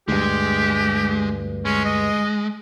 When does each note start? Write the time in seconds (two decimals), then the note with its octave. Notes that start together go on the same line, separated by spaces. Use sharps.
0.08 D2 G2 G#3 G4
1.65 G#3 C#4
1.85 D#5